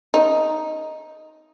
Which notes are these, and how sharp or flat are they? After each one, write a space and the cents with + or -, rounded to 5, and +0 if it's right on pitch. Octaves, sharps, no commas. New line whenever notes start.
D#4 +5